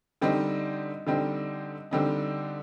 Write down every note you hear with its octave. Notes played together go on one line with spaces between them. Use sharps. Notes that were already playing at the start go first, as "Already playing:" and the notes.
D3 G3 C4 D#4
D3 G3 C4 D#4
D3 G3 C4 D#4